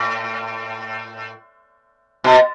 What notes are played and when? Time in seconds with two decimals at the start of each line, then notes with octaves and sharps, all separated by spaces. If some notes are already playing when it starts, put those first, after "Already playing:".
Already playing: A2
2.24 B2